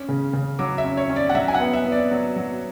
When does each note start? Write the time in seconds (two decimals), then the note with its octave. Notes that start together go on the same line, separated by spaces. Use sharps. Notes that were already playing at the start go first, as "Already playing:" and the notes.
Already playing: C#4
0.09 C#3
0.33 C#3
0.59 F#3 D6
0.78 E5
0.84 C#4
0.97 C#5
1.10 C#4
1.16 D5
1.29 F#5
1.35 F#3 E5
1.48 G#5
1.54 F#5
1.60 B3
1.73 E5
1.85 B3
1.92 D5
2.11 F#3
2.36 F#3